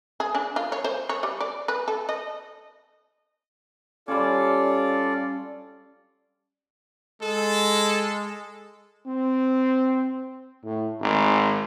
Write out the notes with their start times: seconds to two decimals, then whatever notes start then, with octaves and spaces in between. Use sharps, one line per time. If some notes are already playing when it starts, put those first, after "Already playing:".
0.20 G#4
0.35 D4
0.56 F4
0.72 C#5
0.84 C5
1.09 C#5
1.23 G3
1.41 D5
1.68 B4
1.88 A4
2.09 D#5
4.08 G3 C#4 F4 A4 D5
7.22 G#3 A4
9.06 C4
10.64 A2
11.00 G#1